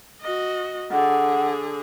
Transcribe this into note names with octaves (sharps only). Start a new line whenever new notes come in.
F#4 D#5
D3 G#4 F#5